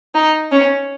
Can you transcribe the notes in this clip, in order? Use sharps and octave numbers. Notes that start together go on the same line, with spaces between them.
D#4
C#4